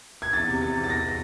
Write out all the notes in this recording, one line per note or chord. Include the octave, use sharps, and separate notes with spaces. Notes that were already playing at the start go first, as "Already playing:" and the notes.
G#6
E2 A6
C3
C3 A6
E2
A6
E2 A#6
A#6